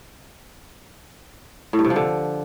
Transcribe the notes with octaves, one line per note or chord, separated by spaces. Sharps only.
A2
G2
C3
F3
D3